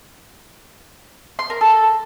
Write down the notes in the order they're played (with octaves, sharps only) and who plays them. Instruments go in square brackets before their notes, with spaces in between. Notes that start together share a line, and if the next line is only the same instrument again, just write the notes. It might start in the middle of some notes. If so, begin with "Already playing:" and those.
[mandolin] C6
A#4
A4